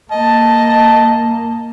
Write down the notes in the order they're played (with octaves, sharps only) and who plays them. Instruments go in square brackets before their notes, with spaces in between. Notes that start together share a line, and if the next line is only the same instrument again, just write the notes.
[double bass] A#3 [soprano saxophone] D#5 [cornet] A5